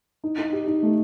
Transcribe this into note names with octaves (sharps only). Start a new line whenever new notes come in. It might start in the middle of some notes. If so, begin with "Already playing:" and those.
D#4
D#4
G4
D#4
A3